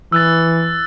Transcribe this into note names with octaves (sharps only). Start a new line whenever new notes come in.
E3 E6 F#6 A6